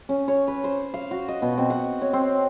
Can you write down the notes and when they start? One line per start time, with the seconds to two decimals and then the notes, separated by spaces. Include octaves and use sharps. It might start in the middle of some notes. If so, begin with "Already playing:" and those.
0.09 C#4
0.28 C#5
0.48 B4
0.64 C5
0.94 F5
1.11 F#4
1.28 D#5
1.42 B2
1.57 C4
1.70 F#5
2.02 C#5
2.13 C4